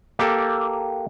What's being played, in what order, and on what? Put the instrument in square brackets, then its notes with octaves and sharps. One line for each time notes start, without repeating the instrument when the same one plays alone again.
[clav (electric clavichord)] A#3 G4 A4